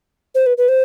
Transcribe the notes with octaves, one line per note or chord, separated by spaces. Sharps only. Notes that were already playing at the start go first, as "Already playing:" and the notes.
C5
B4
B4
C5